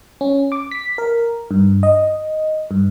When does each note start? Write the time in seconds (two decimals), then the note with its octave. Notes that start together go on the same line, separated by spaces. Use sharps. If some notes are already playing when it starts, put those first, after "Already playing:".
0.21 C#4
0.52 D6
0.71 B6
0.98 A#4
1.51 G2
1.83 D#5
2.71 G2